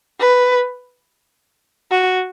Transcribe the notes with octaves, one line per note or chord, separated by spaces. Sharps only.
B4
F#4